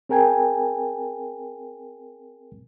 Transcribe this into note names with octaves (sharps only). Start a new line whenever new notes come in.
C4 G#4 A#4 G5 G#5